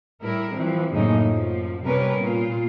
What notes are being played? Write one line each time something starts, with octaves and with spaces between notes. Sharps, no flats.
A2 G3 E4 A#4
E3 F3 G3 C4
F#2 A2 C#3 A#3 C#4 D#4
F#2 F3
C3 G3 B3 C#4 A#4 B4
A#2 F4